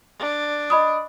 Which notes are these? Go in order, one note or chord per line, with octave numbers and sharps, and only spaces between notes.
D4
D#5 B5 D#6